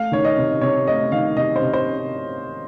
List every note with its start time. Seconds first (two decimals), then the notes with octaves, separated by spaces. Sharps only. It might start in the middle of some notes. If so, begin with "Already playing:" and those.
Already playing: A3 F5
0.12 D#3 C#5
0.25 D#5
0.37 C3
0.61 C3 C#5
0.87 A3 D#5
1.12 D#3 F5
1.37 C3 D#5
1.56 C5
1.62 C3
1.74 C5